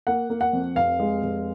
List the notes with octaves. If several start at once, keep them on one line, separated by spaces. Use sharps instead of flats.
A#3 F#5
A#3
F#5
F2
F1 F5
G#3
F1